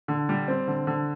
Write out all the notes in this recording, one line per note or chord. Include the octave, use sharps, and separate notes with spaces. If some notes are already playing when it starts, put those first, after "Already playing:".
D3
G3
C4
D3
D3